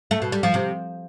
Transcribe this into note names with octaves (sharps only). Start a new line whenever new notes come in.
A3
B2
G3
F3
C3